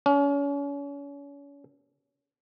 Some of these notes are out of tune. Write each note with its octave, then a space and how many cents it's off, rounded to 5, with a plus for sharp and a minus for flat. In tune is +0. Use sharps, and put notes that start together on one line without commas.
C#4 +35